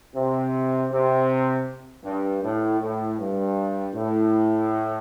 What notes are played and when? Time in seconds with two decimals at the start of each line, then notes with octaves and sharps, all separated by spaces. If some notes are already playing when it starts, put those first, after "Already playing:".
0.14 C3
0.91 C3
2.04 G2
2.43 A2
2.80 A2
3.18 G2
3.95 A2